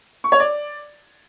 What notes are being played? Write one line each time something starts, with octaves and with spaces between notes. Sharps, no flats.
C#6
C#5
D5